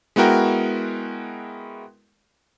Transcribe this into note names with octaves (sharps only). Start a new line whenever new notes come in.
G#3 B3 E4 F#4 A#4 G5